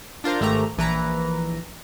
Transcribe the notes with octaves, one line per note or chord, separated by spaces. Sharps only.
D4 F4 A#4 C5
G#1 A3 G4 A#5
A#1 E3 B4 A#5